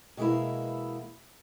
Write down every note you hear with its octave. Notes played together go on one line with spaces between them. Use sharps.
B2 E3 G#3 A#3 E4